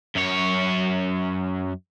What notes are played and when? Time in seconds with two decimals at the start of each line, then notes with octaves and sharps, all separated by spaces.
0.16 F#2 C#5